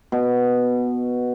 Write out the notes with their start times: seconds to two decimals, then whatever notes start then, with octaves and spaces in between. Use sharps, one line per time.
0.12 B2